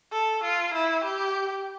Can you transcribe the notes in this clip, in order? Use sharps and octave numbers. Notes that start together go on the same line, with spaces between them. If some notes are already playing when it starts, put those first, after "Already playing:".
A4
F4
E4
G4